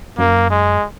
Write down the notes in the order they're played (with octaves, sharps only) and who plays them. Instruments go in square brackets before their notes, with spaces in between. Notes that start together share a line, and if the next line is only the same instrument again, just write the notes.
[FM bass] F#2 [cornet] A#3
[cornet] G#3